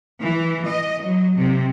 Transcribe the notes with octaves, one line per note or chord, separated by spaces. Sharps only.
E3
D#5
F#3
C3